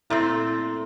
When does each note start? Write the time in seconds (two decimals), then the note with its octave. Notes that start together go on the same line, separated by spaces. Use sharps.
0.10 A#2 A3 C4 E4